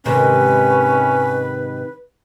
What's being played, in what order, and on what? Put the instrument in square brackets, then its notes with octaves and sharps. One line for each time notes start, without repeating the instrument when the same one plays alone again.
[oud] G#2 C3 D#3 [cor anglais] C#4 [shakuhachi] B4